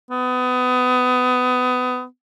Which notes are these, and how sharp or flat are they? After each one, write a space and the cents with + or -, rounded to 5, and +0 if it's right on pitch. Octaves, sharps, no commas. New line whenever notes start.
B3 +25